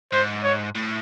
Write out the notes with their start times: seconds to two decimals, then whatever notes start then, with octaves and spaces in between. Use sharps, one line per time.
0.12 G#2 C5
0.44 C#5
0.75 A2